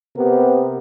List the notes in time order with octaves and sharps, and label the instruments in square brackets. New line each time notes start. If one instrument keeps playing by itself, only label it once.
[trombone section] C3 B3 G4 A#4